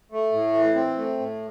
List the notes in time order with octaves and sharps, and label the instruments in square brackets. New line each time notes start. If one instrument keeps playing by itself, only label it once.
[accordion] A3
A2
E3
C4
A3
A2